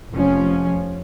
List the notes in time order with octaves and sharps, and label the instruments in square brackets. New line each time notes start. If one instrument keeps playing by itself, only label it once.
[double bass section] F1 F3 C#4